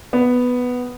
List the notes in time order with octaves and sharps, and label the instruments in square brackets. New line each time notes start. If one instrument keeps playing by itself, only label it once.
[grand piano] B3